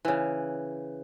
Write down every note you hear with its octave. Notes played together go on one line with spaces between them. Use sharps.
C#3 E3